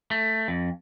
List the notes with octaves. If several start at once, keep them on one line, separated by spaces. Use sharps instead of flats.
A3
F2